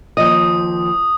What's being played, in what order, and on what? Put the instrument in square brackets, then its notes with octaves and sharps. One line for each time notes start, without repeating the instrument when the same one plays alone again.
[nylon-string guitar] D#2 F3 D#5 [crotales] D#6